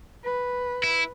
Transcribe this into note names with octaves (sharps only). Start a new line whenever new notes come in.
B4
E4